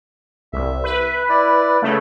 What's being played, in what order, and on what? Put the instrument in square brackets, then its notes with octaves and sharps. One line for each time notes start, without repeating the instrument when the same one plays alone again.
[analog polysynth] C2 [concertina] E5
[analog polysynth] B4
[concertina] E4 D5
[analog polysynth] C#3 A3